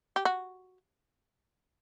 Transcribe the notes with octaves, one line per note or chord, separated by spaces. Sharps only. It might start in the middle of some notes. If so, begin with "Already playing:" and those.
G4
F#4